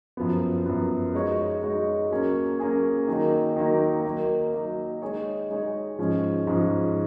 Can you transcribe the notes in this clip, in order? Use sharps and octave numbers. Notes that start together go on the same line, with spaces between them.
F#2 F3 B3
F#2 F3 B3
G#3 D#4 F#4 C#5
G#3 D#4 F#4 C#5
F#3 A#3 C#4 G#4
F#3 A#3 C#4 G#4
D#3 F#3 A#3 D#4
D#3 F#3 A#3 D#4
F#3 A#3 D#4
F#3 A#3 D#4
G#3 D#4 G#4 C#5
G#3 D#4 G#4 C#5
G#2 F3 G#3 C#4
G#2 F3 G#3 C#4